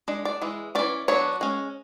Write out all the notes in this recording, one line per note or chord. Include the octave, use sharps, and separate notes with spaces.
G#3 D4
D5
E3 G#3
E3 A3 C#4 D5
F#3 B3 D4 C#5
G#3 C#4